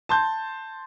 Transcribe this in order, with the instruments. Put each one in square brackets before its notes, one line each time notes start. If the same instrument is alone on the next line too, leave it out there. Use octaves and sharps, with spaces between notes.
[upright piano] A5 C6 G6